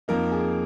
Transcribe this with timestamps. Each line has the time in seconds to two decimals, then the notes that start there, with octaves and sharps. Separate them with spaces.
0.08 F2 F3 A#3 D#4 A#4
0.32 G#4